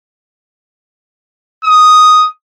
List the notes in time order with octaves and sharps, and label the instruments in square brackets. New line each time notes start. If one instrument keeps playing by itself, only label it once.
[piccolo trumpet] D#6